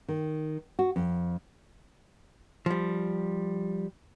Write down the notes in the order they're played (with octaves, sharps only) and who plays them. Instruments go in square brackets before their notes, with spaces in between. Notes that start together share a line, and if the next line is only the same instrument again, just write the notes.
[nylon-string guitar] D#3
F#4
F2
[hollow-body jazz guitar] F3 G3